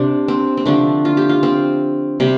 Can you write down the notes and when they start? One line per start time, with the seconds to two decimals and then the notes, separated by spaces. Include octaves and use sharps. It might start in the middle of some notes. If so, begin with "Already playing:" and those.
Already playing: C3 D4
0.28 C4
0.57 C4
0.66 D3 F3 A3 D4
1.05 F4
1.17 G4
1.29 F4
1.43 C4
2.20 C3 G3